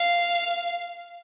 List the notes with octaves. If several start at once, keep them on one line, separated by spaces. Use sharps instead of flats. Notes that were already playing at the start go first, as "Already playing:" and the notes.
Already playing: F5